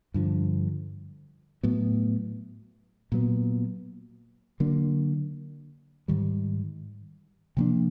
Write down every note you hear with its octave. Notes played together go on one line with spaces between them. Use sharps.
G2 D3 F3
A2 F#3 B3
A#2 F#3 B3
D3 F#3 A#3 D4
G#2 D#3 G3
C3 F3 A#3 D4